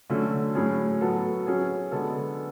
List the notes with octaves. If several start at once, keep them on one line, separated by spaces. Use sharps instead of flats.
D3 F#3 A3 C#4
A2 F#3 C#4 G#4
F#3 B3 F#4 A4
F#3 C#4 G#4
D3 G#3 B3 F#4 A4